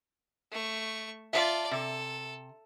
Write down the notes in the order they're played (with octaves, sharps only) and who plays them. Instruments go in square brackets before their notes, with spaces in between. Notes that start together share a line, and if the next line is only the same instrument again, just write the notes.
[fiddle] A3 C#6
[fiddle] F4 D5 [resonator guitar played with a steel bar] E5 A5
[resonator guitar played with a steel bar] C3 [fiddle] A4